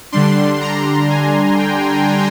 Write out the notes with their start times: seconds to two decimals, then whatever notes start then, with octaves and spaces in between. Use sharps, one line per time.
0.12 D3 G3 D4 C6
0.61 A#5
1.10 G#5
1.59 G5